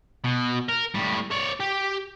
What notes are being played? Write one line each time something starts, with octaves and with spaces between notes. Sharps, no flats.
B2
A#4
A2 G3
C#5 D5
G4